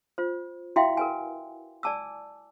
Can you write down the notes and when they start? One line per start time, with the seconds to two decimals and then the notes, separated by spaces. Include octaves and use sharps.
0.18 F4 C5
0.76 E4 F#4 E5 F5 G5 C6
0.97 A#4 B4 G#5
1.83 D5 G#5 A5 D6 E6